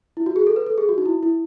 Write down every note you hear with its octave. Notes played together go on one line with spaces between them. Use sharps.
E4
F#4
G#4
A4
B4
A4
G#4
F#4
D#4
E4
E4